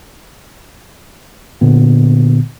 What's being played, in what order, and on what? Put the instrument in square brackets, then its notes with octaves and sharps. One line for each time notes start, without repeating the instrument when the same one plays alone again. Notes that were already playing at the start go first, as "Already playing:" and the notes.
[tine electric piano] A#2 D3 B3